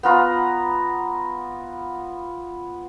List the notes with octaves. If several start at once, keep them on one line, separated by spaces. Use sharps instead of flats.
B3 F4 A#5